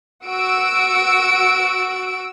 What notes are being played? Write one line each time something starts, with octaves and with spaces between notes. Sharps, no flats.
F#4 E6 D7